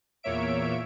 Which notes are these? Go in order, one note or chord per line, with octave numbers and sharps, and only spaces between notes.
E2 A#2 A#3 C#5 E5 D7